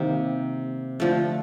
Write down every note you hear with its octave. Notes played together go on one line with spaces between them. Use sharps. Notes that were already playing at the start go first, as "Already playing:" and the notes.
Already playing: C3 D#3 A#3
D3 F3 A3